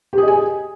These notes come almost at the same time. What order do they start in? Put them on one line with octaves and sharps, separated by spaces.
G4 G#4 D#5 G#5